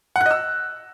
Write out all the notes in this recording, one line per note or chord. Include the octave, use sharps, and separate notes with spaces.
F#5
F#6
D#5
E6